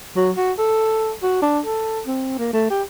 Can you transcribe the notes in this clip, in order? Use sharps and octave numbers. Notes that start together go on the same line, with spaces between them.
F#3
F#4
A4
F#4
D4
A4
C4
A#3
A3
G4